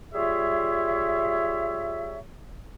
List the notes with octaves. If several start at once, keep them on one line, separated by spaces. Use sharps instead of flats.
G3 F4 G#4 C#5 E5